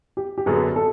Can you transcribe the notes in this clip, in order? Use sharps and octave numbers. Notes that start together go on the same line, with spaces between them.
G4
G4
F#2 D3 F#3 B3 G#4
A4